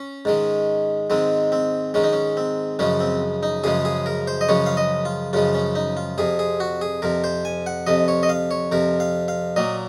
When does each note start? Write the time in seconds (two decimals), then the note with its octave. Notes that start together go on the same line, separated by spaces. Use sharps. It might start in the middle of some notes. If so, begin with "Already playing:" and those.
Already playing: C#4
0.25 G#2 D#3 G#3
1.10 G#2 D#3 G#3 C4
1.52 C4
1.94 G#2 D#3 G#3 C#4
2.04 D#4
2.13 C#4
2.37 C4
2.79 F#2 C#3 F3 G#3 C#4
3.00 C4
3.43 D#4
3.64 F#2 C#3 F3 G#3 G#4
3.85 G#4
4.06 A#4
4.27 C5
4.41 D#5
4.48 F#2 C#3 F3 G#3 C#5
4.66 F5
4.77 D#5
5.05 F4
5.33 F#2 C#3 F3 G#3 F4
5.55 C#4
5.75 D#4
5.97 F4
6.18 F2 C3 F3 G#4
6.39 G#4
6.60 F#4
6.81 G#4
7.02 F2 C3 F3 A#4
7.24 C5
7.45 G#5
7.66 F#5
7.87 F2 C3 F3 D#5
8.08 C#5
8.23 D#5
8.29 F5
8.51 C#5
8.72 F2 C3 F3 A#4
9.00 F5
9.28 F5
9.56 A#2 F#3 A#3 D#5